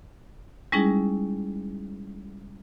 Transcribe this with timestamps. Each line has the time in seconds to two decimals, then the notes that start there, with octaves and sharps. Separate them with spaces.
0.72 G3 G#3 C#4 D#4 E4 G#4